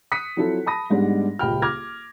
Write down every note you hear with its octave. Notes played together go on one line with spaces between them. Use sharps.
D#6 F#6 B6 C#7
F3 F#3 C4 E4 A4
A5 B5 D#6 A#6
G#2 G3 G#3 B3 D4
D#1 C#2 G4 G5 B5 F6
D6 F6 G#6 A#6